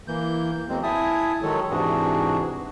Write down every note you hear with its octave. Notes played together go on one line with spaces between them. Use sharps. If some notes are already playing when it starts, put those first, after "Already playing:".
E3 A#3 G6
E2 F#3 G#3 A#3 C4
E4 E5 G#5 A5 D#6
D#3 F#3 G#3 A4 C#5
G#2 C3 E3 D4 F#4 G#4